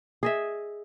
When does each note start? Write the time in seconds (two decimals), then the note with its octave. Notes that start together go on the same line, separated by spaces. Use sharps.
0.23 G#4 D#5 E5